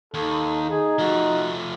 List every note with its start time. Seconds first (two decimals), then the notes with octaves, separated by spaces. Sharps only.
0.14 D#2 D#4 A4
0.70 D#4 G#4
0.99 F3 A3 F#4